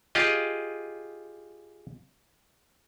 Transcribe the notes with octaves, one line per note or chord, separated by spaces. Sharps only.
F4 G4 G#4 D#5